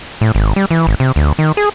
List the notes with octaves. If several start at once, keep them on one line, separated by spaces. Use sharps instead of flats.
A2
G#1
G3
E3
G#1
C3
D2
D#3
G#4